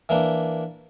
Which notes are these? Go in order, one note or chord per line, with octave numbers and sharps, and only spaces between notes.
E3 A#3 D4